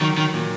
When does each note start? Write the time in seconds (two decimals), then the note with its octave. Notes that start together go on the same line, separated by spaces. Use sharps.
0.01 D#3 F#3
0.18 D#3
0.34 A#2